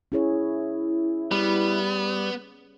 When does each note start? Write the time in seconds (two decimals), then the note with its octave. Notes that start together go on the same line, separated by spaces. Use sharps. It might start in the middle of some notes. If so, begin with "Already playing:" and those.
0.12 C#4 E4 G#4 C#5
1.31 G3 B3